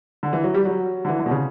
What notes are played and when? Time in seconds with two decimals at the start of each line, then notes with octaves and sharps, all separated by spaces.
0.23 D3
0.33 E3
0.44 F#3
0.54 G3
0.65 F#3
1.05 D3
1.09 E3
1.19 D3
1.26 B2
1.31 C#3